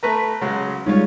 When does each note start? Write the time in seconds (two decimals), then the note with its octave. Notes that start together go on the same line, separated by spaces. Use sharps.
0.03 A3 B4 A#5
0.41 C#3 F#3 G#3
0.86 G3 G#3 C#4 D#4 F4 C#5